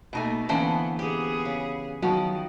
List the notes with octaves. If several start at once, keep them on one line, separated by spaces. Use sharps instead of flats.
B2 A3 A#3 D#4 G#5
D3 E3 A#3 B3 C#4 C5 A5
B3 G4 G#4
C#3
D#3 F3 F#3 B3 F#4